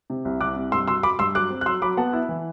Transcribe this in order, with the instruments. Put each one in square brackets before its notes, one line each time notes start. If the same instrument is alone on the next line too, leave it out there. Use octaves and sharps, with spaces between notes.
[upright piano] C3
C2
[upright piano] C2 [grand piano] D6 F#6
[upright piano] C3
[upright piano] G2 [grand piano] C6 E6
[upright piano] F#4 [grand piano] C6 E6
[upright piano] F#4 [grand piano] B5 D6
[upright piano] G2 [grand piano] C6 E6
[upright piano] F#3 [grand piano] D6 F#6
[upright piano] C4
[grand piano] F#6
[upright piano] F#3 [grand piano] C6 E6
[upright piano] F#3 [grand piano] B5 D6
[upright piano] B3 [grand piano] F#5 A5
[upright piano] E4
E3